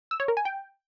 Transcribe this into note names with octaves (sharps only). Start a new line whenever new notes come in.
E6
C#5
A#4
G#5
G5